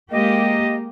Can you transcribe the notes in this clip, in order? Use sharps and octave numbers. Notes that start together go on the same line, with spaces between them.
G#3 A#3 G4 D#5